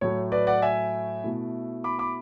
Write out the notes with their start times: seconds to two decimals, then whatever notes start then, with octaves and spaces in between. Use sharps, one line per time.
0.01 A2 F#3 A3 C#5
0.32 B4 D5
0.47 D5 F#5
0.62 E5 G#5
1.24 B2 A3 E4
1.84 B5 D6
1.99 B5 D6